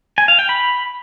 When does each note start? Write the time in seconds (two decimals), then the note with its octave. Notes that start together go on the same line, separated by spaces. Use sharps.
0.18 G#5
0.28 F5
0.39 G5
0.49 B5